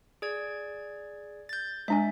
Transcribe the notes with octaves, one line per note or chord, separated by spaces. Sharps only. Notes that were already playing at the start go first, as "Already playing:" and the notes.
G#4 D5 G#6
G6 A6
G#3 D4 E5 G#5